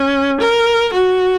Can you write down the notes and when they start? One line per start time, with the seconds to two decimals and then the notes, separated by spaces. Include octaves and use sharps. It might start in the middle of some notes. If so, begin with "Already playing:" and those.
Already playing: C#4
0.40 A#4
0.93 F#4